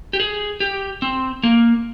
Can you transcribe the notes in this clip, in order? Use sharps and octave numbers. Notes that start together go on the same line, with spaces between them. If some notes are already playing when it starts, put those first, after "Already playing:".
G4
G#4
G4
C4
A#3